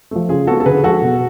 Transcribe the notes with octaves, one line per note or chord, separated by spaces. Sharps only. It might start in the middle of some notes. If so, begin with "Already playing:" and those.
F3 A3
C#3 F4 G#4
G#3 B3 F#4 A4
A4
D3 G#4 B4
F3 G#3 F#4 A4
B2